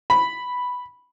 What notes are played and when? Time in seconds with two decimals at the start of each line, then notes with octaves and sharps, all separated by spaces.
0.10 B5